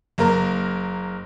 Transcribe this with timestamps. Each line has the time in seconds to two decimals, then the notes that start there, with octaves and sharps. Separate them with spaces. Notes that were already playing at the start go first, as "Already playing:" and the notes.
0.18 F#1 A#3 A#4